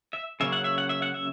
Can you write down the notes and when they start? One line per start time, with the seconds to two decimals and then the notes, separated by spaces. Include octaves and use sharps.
0.13 E5
0.40 C#3 F#3 A#3 C#4 E5
0.52 F#5
0.64 E5
0.78 F#5
0.89 E5
1.02 F#5
1.14 E5